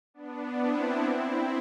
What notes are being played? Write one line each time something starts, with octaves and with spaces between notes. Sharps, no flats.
B3 D4
C4 E4
C4 E4